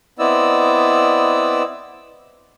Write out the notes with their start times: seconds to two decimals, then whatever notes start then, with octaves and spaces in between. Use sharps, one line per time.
0.19 B3 C4 E4 D5 D#5 E6